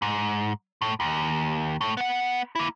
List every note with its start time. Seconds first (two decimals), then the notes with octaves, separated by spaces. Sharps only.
0.02 G#2
0.82 A2
1.00 D#2
1.81 A2
1.97 B3 F#5
2.56 A#3 E4